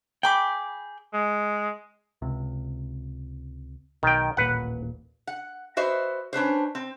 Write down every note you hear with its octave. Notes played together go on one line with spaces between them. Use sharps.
G#4 G5 B5 D6
G#3
C#2 C3
B1 D#3 G5
D#1 A1 A#2 B4 F#5
F#5
F#4 B4 C5 D#5 E5
C#4 D4 B4 C5
C4